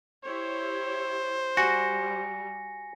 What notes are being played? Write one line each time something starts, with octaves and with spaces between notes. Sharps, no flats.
E4 G4 C5 C#5
G3 F#4 G#5 A#6 C#7